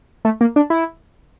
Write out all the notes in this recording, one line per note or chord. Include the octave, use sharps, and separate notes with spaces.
A3
A#3
D4
E4